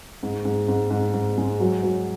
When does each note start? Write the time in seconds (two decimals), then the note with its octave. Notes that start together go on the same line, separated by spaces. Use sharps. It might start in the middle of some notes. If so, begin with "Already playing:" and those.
0.23 G#2
0.45 G#2
0.68 G#2
0.90 G#2
1.13 G#2
1.38 G#3
1.60 F#3
1.83 F#3